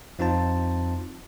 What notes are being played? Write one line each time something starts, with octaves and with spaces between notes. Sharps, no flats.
F2 C4 D#4 F4 C5 A5